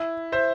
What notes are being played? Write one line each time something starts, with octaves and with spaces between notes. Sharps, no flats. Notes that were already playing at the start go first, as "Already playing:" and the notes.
Already playing: E4
C5 E5